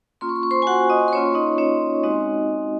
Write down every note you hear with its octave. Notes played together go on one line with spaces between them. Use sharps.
A#3 C#4 F4 C6
C#6
C6
C#6
C5 C6
G#5
F#4 F#5
D#5 D#6
C6
A#3 C#4 F4 C#5 C#6
D#4 D#5
C#4 C#5
G#3 C4 D#4 F#4 D#5